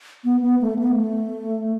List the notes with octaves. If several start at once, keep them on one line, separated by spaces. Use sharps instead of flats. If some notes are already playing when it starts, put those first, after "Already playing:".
B3
B3
A3
B3
A3